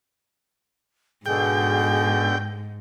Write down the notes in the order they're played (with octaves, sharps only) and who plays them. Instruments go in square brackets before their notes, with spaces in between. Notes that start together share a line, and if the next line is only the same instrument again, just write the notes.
[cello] G#2 [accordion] B2 D3 [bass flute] G#4 [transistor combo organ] G5